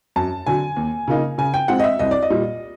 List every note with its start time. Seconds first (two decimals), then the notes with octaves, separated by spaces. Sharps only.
0.16 F#2 A5
0.47 D3 F#3 G#5
0.77 D#2
1.08 C#3 F3 A#3 D#4
1.38 C#3 G#5
1.54 G5
1.68 F3 G#3 C4 F#5
1.80 D#5
1.84 E5
1.99 C2 D#5
2.11 D5
2.23 D#5
2.30 A#2 G3